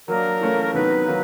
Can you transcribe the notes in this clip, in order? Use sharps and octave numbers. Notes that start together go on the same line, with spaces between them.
F#3 A#3 D4 A#4
E3 A3 C#4 F4
C3 D#3 F#3 B3 D#4 B4
D#3 F#3 A#3